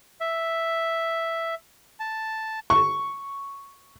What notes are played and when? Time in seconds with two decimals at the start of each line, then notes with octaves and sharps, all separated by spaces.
0.21 E5
2.00 A5
2.70 C#6